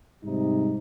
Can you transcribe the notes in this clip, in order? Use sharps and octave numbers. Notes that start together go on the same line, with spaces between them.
G#2 C3 G3 D#4